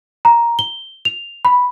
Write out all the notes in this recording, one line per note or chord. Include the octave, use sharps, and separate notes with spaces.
A#5
G7
F7
B5